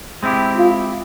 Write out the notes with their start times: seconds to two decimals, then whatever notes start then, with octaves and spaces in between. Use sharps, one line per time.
0.23 G#3 C4 E4 G4
0.58 F4